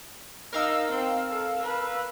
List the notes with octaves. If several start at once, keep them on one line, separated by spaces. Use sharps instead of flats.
D#4 A#4 F5 E6
C4
A4
B4